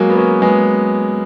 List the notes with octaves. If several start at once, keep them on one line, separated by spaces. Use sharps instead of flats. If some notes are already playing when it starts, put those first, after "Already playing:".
Already playing: F#3 G#3 A#3
B3
A#3 C#4
G#3 B3